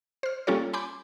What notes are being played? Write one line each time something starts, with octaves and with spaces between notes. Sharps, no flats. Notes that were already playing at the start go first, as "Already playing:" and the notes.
C5 F6
G3 A#3 C#4 F4 A4 C#5
G#5 B5 C6 D6 G6